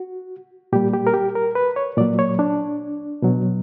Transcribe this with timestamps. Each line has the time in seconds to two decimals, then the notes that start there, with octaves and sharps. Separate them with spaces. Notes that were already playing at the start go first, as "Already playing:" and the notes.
Already playing: F#4
0.73 A#2 G3 G4
0.94 G4
1.07 A#4
1.14 G4
1.35 A#4
1.55 B4
1.76 C#5
1.97 A#2 F#3 D5
2.19 C#5
2.39 D4
3.22 B2 F#3